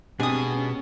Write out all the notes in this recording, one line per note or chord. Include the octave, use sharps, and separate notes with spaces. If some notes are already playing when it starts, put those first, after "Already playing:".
B2 G#3 C4 D4 G4 G#5 D#6
C#4